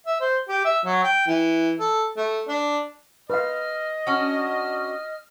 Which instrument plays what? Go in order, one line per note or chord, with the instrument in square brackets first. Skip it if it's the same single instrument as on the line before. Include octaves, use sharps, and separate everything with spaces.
[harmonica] E5
C5
G4
E5
F#3
G5
E3
A4
A3
D4
[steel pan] B4 F5 [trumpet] D#5 [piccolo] F6
[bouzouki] C#4 D4 F#4 [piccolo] F6